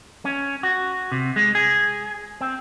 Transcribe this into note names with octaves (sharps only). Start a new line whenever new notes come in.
C#4
F#4
C3
G#3
G#4
C4